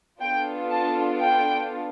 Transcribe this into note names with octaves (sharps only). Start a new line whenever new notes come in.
B3 D4 F4 A4 G5
A5
G5